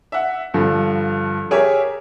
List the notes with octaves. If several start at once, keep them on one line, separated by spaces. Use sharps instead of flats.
E5 F#5
G2 D3 F3
G4 G#4 A#4 C#5 E5 G#5